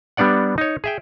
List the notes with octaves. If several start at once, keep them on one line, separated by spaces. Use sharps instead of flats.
G3 B3 D4 D5 F#5
D#4 C#5
G#4 E5 G5